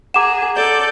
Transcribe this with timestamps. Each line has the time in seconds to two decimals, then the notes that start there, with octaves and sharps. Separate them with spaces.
0.14 G#4 F#5 A#5 D6 E7
0.54 A4 D5 G6